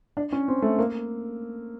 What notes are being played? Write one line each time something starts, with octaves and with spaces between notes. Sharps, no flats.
D4
C#4
C4
A3
A#3